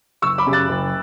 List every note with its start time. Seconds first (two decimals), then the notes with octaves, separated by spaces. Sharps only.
0.22 F#1 C#6 E6
0.38 B5 D6
0.46 F#2 C#3 G3
0.53 F#6 A6
0.69 F#1